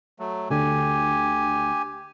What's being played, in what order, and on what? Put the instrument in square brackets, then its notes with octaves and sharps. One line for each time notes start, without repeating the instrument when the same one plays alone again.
[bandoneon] F#3 A3
[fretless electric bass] D2 D3 [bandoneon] G4 G#5